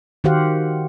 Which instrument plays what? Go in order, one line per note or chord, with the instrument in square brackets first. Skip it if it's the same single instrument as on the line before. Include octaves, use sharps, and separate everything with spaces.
[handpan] D#3 F#4 G4 C5 F5 F#5